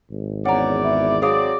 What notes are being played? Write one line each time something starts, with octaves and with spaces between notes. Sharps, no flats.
G#1
E2 C#4 D5 F#5 A#5
E4
F#3 C4 G#4 D5 F5 D#6